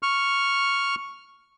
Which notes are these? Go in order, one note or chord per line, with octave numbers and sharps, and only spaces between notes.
C#6 F6